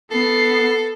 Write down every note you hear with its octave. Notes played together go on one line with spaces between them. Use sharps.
B3 A4 C7